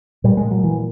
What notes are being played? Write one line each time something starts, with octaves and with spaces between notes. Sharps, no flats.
A#2 G3
G#3
F#3
E3